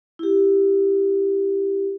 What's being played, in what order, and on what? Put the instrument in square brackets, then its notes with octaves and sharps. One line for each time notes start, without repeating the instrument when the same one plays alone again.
[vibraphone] E4 G4